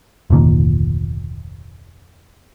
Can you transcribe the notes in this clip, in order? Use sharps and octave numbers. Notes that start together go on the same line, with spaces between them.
F1 D2 A#2 D#3